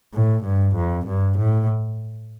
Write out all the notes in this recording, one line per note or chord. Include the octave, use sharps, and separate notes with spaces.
A2
G2
F2
G2
A2